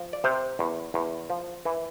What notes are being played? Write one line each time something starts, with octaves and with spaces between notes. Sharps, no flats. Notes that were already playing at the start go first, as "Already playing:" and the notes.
Already playing: F3
D5
C3 C5
E2
E2
F3
E3